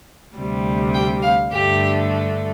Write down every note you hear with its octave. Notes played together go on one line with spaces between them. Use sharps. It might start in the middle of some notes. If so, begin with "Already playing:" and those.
D2 C3 G3
G5
F5
G2 D3 A3 G4